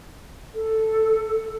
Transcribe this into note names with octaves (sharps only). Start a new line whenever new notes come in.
A4